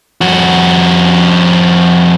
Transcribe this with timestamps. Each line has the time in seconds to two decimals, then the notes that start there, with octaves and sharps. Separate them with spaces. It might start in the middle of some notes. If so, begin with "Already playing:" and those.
0.21 F2 F#4